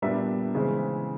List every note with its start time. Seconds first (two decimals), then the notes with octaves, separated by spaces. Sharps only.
0.02 A#2 G3 B3 D4 E5
0.55 C#3 E3 G#3 C4